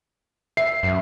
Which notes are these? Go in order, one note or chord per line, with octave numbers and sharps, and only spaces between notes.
E5 C7
F#2